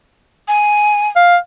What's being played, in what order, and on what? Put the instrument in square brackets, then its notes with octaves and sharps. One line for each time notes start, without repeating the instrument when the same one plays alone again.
[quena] G#5
[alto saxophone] F5